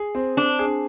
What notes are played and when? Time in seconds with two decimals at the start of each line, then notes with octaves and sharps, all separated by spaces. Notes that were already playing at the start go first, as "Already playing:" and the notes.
Already playing: G#4
0.15 C4
0.37 C4 D4
0.59 G#4